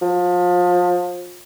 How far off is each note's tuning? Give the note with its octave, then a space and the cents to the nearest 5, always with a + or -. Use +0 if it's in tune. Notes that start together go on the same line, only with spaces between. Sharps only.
F3 +30